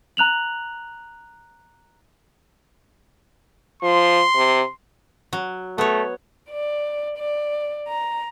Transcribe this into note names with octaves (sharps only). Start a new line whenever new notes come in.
A#5 F#6 F7 F#7
F3 C6
C3
F#3
A3 B3 C#5
D5
D5
A#5